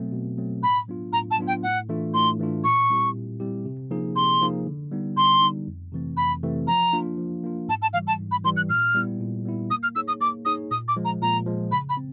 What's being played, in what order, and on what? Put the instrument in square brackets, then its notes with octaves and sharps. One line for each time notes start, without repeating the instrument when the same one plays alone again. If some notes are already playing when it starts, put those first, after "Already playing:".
Already playing: [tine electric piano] B2 F#3 A3 C4
B2
F#3 A3 C4
[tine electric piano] A2 [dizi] B5
[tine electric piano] F#3 B3 D4 F4
[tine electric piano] A2 [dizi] A#5
[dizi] A5
[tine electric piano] F#3 B3 D4 F4
[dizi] G5
[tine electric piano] A2 [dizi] F#5
[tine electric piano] E3 A3 D4 F4
[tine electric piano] A2 [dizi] C6
[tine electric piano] E3 A3 D4 F4
[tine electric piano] A#2 [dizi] C#6
[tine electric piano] G3 C4 E4 G4
A#2
G3 C4 E4 G4
C3
F3 A#3 D#4 G#4
[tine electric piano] C3 [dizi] C6
[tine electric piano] F3 A#3 D#4 G#4
D3
G3 B3 D#4
[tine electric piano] D3 [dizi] C6
[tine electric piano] G3 B3 D#4
F2
C3 E3 A3 C4
[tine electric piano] F2 [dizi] B5
[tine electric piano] C3 E3 A3 C4
[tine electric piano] F3 [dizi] A#5
[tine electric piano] A#3 D4 F4
F3
A#3 D4 F4
[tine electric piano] G#2 [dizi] A5
[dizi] A5
[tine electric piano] E3 G3 [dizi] F5
[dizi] A5
[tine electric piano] G#2
[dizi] B5
[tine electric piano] E3 G3 [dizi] C6
[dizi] F#6
[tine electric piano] A#2 [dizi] F6
[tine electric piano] G3 B3 E4
A#2
G3 B3 E4
[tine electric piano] A#3 [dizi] D#6
[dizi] F6
[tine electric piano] D#4 G#4 C#5 [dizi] E6
[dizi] D#6
[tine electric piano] A#3 [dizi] D6
[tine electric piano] D#4 G#4 C#5 [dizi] D#6
[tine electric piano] A#2 [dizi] D#6
[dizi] D6
[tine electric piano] F3 G#3
[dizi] A#5
[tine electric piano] A#2 [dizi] A#5
[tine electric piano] F3 G#3
[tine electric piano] C#3 [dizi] B5
[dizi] B5
[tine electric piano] C4